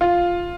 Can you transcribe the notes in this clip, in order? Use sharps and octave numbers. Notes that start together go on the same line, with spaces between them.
F4